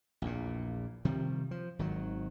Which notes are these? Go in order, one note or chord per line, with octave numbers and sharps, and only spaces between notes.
A#1 E2 A#2
C3 D#3 F3 G3
F3
G#1 D#3 F#3